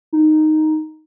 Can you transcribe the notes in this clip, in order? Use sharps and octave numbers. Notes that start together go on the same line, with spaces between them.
D#4